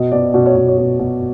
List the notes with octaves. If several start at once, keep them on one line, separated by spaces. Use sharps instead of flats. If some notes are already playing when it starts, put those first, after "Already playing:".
Already playing: B2 D#5
B2 D5
B2 D5
C#5
B2
C#5
B2
B2